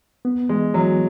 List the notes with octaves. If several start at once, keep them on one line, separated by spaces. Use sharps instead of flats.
B3
E3 G#3
E3 F#3